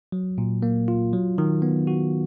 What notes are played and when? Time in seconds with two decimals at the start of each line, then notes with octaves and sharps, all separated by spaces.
0.12 F#3
0.38 A#2
0.62 A#3
0.88 F4
1.13 F#3
1.38 D#3
1.62 B3
1.87 F#4